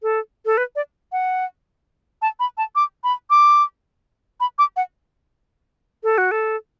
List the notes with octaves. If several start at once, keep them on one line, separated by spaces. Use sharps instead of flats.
A4
A4
B4
D5
F#5
A5
B5
A5
D6
B5
D6
B5
D6
F#5
A4
F#4
A4